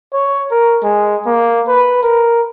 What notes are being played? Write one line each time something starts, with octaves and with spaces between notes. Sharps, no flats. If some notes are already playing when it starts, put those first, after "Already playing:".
C#5
A#4
G#3
A#3
B4
A#4